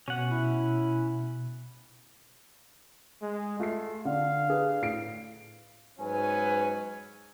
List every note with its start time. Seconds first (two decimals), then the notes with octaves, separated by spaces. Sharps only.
0.08 B2 C#4 F#5
0.31 E4
3.22 G#3
3.59 A3 F4 C7
4.05 D3 D4 F5
4.48 D4 G#4 B4
4.82 A2 C7 D7
5.99 G#2 F#3 C#4 B4 G#5